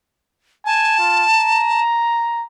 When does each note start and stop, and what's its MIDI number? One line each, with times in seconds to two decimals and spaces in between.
0.66 0.98 80
0.66 1.83 81
0.99 1.25 65
1.34 2.44 82